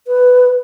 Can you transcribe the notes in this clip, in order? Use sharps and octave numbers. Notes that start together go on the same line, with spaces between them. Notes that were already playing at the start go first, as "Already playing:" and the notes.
B4